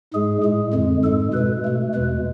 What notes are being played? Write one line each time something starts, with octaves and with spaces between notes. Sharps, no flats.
G#2 G#3 G#4
A2 G#3
F2 D3 G#3
G#2 G#3 A4
B2 G#3 B4
B2 A3
E2 B2 G#3 B4